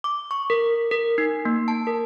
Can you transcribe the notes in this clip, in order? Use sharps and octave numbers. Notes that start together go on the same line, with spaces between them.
D6
C#6
A#4
A#4
D#4
A#3
A5
A#4